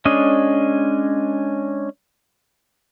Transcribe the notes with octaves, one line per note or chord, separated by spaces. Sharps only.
G#3 C#4 D4 D#5